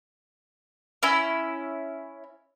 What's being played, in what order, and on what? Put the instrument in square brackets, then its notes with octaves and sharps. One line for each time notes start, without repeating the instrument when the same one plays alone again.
[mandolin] C#4 E4